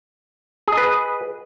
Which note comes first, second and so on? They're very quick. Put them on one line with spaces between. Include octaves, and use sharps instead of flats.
G#4 D#5 B4